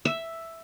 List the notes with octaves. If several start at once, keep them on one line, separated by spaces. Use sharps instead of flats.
E5